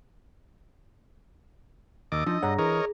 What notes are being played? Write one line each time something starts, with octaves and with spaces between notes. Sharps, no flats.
D#2 D#5 D6 E6 A6
F3 D4 D#4 D#5
G2 G#4 C#5 F#5 A#5 A#6
E3 G#4 A#4 C#5 D#5